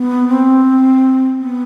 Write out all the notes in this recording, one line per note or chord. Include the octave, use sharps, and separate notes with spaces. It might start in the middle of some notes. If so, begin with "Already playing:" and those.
Already playing: B3
C4
B3